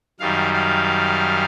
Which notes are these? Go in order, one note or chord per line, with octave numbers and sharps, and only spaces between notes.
F#2 D#3 G3 F5
F5